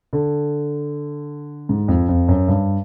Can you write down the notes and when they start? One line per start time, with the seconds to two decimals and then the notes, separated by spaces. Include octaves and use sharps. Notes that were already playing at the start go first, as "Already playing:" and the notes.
0.13 D3
1.69 G#2
1.88 F2
2.09 F2
2.28 F#2
2.48 G2